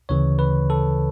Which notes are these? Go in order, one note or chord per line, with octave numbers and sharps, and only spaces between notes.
D2 C#3 E3 C#5
B4
A4